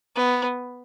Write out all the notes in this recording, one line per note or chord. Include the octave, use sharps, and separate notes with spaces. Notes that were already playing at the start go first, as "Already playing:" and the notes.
B3